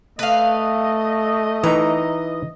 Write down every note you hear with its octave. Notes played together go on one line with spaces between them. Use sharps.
A3 B4 D#5 F5
E3 D#4 A#5